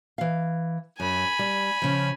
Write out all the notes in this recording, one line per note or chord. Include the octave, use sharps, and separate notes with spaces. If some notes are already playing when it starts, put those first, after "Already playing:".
E3 F5
F#2 G#5 B5
G3
C#3 F3